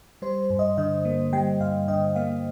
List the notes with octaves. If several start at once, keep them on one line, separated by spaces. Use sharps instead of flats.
G3 C5
G2
D#5
D3 D#5
A#3
G3 G5
G2 F5
D3 D#5
A#3 F5